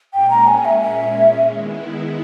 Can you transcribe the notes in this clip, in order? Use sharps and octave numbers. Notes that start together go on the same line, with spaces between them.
A#2 G#3 C#4 G5
A#5
G#5
E5
E5
D#3 G#3 B3 E4